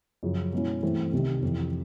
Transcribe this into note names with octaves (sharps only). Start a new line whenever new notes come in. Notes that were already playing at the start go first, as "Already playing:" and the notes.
F#2 C#3 F3
B2 G#3 C#4 E4
G2 E3 A3 C4
C2 C3 D#3
F2 C3 E3